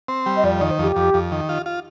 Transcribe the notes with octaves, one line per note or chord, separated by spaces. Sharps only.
C4
G3
D#5
F2 D5
D5
D#3
C5
F2 G4
F2
F2
D#3
F4
F4